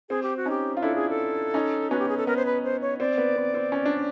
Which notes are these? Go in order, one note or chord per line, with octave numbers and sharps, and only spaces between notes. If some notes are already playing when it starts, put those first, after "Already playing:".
C4 G#4
G4
F#4
C#4 D#4 G4
F4
D4 E4 A4
G#4
A4
C#4 D#4
B3 C#4 F#4
G4
G#4
A4
B3 A#4
C5
B4
C5
C#5
C4 D5
B3
C4
C4
C#4
D4